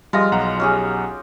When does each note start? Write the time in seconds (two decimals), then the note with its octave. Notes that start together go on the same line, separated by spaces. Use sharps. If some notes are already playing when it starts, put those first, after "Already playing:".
0.13 F3 G3 G#3 F4 A#6
0.32 B1 F#5 A#5
0.60 C#4 G4 G#4